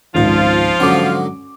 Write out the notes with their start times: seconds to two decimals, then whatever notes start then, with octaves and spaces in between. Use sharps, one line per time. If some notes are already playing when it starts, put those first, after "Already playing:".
0.15 G#1 C#2 F3 F4
0.80 G#2 D3 F#3 C#4 D6